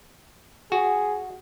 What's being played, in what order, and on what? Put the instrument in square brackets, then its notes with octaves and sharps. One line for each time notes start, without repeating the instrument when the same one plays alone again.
[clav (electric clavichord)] F#4 [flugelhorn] G#4